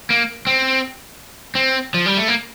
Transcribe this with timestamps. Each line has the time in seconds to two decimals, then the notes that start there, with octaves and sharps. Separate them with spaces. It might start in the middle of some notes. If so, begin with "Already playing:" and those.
0.10 A#3
0.47 C4
1.55 C4
1.94 F3
2.06 G3
2.17 A3
2.28 A#3